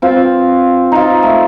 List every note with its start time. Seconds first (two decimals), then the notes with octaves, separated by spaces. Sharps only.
0.02 C4 F4
0.92 D#4 F4
1.23 A3